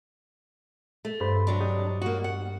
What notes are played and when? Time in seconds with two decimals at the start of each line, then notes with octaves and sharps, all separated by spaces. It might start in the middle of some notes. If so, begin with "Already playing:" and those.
1.05 A3
1.20 G2 C5 B5
1.47 C3 F#3 D4
1.60 G4 D#5
2.02 A#3 F#4
2.24 F#5